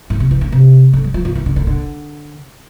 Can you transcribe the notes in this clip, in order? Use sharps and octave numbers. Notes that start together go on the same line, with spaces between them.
A2
C3
E3
D3
C3
D3
G3
F3
F3
E3
D3
D3
D3